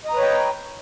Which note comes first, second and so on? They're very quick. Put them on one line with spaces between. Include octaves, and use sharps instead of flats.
D#5 A#5 B4 C#5 G5